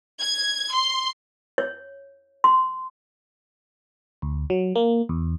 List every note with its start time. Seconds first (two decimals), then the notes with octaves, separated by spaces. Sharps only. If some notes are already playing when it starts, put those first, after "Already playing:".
0.20 G#6
0.75 C6
1.58 C#5
2.44 C6
4.22 D2
4.50 F#3
4.76 A#3
5.09 E2